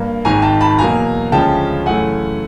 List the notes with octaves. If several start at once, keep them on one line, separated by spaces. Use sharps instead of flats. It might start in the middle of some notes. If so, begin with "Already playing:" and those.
Already playing: G2 A#3
G#1 G#2 D#3 G#5 A#5
G5 A5
A5 B5
E2 B2 F#3 A#3 G#5 A#5
D2 C#3 F3 G#3 C#4 G5 A5
F#2 C#3 E3 A3 C#4 F#5 G#5